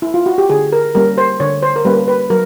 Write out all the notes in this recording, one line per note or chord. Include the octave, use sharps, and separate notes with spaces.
E4
F4
F#4
G4
D3 G#4
A#4
G3 A#3 C#4 A#4
C5
D3 C#5
C5
A#4
G3 A#3 C#4 B4
B4
F#3 A#4